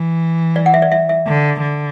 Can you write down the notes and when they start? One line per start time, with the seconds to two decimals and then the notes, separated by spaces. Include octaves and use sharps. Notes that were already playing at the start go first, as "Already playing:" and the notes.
Already playing: E3
0.56 D5
0.66 F#5
0.74 E5
0.82 D5
0.92 E5
1.09 E5
1.27 D3
1.61 D3